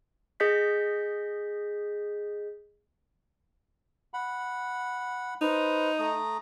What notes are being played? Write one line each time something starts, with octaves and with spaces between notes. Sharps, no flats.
G#4 D#5 G6 B6
F#5 B5
D#4 B4 C5
A3 A#5 D#6